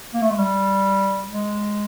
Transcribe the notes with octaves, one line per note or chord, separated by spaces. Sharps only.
A#3
A3
G#3
G3
G#3